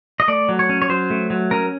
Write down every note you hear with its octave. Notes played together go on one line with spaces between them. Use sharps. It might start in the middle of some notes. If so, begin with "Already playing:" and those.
D#5
A3 D5
F#3
C#5
C#4
C#5
F#3 C5
A3
F#3
C#4 A#4